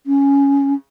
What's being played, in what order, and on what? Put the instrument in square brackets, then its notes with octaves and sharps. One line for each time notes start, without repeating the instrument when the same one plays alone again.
[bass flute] C#4